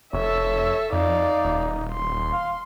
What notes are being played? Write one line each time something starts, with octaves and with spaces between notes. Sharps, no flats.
F1 A4 C#5 E5
F2 D#4 D5 F5
D#1
C6
F5